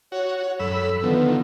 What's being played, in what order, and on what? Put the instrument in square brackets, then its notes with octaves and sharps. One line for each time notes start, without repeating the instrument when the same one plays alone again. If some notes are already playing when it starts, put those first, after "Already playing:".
[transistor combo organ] F#4 [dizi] C#5
[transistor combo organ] F#2 B5 E6 [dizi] A4
[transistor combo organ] D3 D#3 F3 [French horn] B3